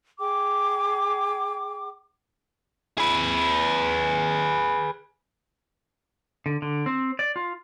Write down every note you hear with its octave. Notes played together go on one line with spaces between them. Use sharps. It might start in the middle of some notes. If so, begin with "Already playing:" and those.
G#4 G5 D6
G#4 B4
D3
D3
C4
D5
F4